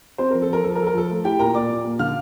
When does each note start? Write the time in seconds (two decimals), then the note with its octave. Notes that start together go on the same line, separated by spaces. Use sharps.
0.18 C4 C5
0.31 F3 A#4
0.42 A4
0.49 F3 A#4
0.64 F3 A4
0.75 A#4
0.79 F3 A4
0.87 A#4
0.94 F3 A4
1.09 A3
1.24 E4 G4 G5
1.39 A#2 A#4 A#5
1.54 A#3 D5 D6
1.70 A#2
1.84 A#3
1.99 D3 F5 F6